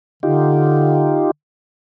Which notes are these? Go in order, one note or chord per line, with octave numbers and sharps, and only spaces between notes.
D3 D#4 F4 G4